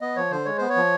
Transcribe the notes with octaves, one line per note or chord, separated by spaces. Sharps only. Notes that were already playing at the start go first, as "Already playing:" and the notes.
B3 D#5
F3 C#5
D3 C5
G#3 C#5
B3 C5
C#5
F3